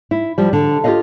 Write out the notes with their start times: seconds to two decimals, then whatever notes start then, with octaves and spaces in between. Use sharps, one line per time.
0.11 E4
0.38 F3 G3
0.53 D3
0.84 F4 G4 A4 B4 D#5 F5